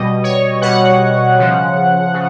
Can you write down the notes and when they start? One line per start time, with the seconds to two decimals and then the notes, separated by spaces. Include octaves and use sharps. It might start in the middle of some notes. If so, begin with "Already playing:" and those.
Already playing: B2 G3 D#5
0.23 C#5
0.61 B2 G3 F#5
1.38 C#3 F3
2.14 C#3